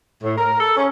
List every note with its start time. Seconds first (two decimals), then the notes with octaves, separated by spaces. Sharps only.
0.23 A2
0.38 A#4
0.60 A4
0.77 C#4